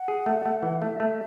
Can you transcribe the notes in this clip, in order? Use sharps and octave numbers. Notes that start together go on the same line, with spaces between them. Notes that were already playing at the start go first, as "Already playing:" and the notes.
Already playing: F#5
G#4
A3
A3
E3
A3 E5
A3